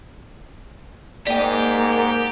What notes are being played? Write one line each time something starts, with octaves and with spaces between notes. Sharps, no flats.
G#2 A#3 G4 D5 G5